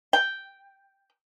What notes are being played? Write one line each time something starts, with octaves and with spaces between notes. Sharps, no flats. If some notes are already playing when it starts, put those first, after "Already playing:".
G5